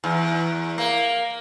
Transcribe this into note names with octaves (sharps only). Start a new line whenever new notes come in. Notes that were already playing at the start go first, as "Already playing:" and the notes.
E2
A#3